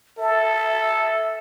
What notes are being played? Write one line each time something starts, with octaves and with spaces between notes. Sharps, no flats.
A4 E5